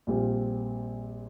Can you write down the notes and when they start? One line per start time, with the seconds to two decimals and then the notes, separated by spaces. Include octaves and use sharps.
0.07 A#1 A#2 G3 C4 G4